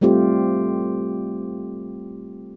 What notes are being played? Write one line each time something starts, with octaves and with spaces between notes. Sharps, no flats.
G3 A3 C4 F4 G4